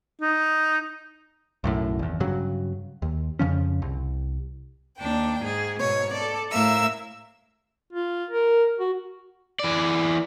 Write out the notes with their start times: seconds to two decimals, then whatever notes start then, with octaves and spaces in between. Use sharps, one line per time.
0.21 D#4
1.64 B1 F#2 A2
1.99 G#1 E2
2.20 G2 C#3 F#3
3.02 D#2
3.39 F2 C#3 F3 C#4
3.82 C2
4.98 D#2 D4 G5
5.42 G#2 G#4
5.80 G#2 B2 C#5
6.13 A4 D5
6.49 A2 A#4 E5 F5 E6
7.93 F4
8.30 A#4
8.79 F#4
9.60 E3 D5